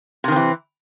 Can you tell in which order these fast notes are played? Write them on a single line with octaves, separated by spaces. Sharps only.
C3 D#3 C4 E3